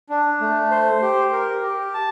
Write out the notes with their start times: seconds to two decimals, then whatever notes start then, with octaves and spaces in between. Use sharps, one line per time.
0.09 D4
0.41 A3
0.71 C5
1.02 G4
1.32 A#4
1.62 G4
1.94 A5